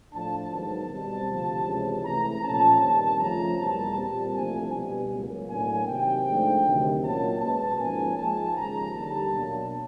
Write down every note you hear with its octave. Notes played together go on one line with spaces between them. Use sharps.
A2 F3 A3 D4 A5
G#2 D#3 F#3 B3 A5
B2 G3 C4
D2 C3 F3
C#2 C3 E3 G#3 C#4
C#2 C3 E3 A3 A#5
A#2 F3 A3 C#4 A5
G2 D#3 G3 C4 A5
F2 C#3 F3 A3 C#4 A#5
E2 B2 G3 A#3 A5
A#2 G3 C4
C2 C3 F3 A3 D4 G#5
B2 G3 B3
C#2 B2 F#3 A#3
A2 F#3 A#3 D4 G#5
C3 D#3 F#3 G5
G#2 F3 A3 D4
D2 C3 D#3 F#3
A#2 F#3 A#3 C#4 A5
B2 G#3 B3 A5
G#2 F3 A#3 C#4 G#5
G#2 F3 G#3 A5
D#2 C#3 F3 G#3 A#5
D#2 D3 G3 A5
B2 F#3 A#3 D4